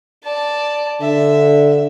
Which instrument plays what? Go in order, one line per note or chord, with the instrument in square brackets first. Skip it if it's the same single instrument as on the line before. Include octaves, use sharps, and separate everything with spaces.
[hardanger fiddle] D5 A5
[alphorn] D3 [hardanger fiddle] E5